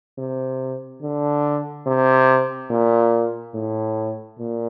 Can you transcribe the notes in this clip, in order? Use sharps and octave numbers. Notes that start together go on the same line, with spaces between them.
C3
D3
C3
A#2
A2
A#2